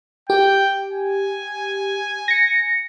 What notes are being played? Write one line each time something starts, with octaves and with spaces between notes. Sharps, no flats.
G4 G5
G#5
A#6 C#7